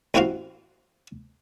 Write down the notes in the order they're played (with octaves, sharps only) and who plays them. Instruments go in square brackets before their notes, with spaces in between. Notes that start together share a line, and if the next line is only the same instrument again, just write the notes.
[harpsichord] A1 C4 E4 F#4 F5 C6